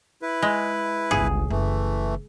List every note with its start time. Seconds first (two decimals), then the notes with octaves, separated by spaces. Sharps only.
0.22 E4 B4
0.42 G#3
1.11 G1 C#2 G#4
1.50 F#1 E3 A3